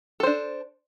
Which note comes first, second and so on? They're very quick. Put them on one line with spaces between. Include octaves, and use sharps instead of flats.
A4 C5 D4